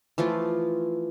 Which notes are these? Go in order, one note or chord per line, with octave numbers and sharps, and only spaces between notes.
E3 F3 A3 F4